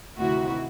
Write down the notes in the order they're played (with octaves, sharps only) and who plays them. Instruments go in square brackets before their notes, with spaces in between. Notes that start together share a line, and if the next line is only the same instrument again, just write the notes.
[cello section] D2 C3 D#3 E4 F#4